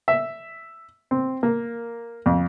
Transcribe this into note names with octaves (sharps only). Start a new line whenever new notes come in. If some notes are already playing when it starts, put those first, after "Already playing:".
E5
C4
A#3
F2